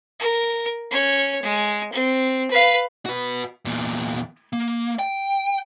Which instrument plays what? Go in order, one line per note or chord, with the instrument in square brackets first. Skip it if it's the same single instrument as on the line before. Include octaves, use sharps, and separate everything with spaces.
[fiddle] A#4
C#4 C#5
G#3
C4
B4 F5
[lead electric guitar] F#4 B4
E2 A#2
A#3
G5